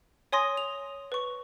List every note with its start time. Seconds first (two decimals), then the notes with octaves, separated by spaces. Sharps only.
0.32 C#5 G#5 C6 D#6 A#6
0.57 F7
1.12 B4 C#6